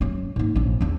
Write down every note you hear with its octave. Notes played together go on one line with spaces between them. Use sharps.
F#2 C#4
G#2 A#3
A#1 C#4
E2 C#4